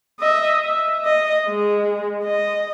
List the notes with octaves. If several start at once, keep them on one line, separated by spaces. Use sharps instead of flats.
D#5 E5
E5
D#5
G#3
D#5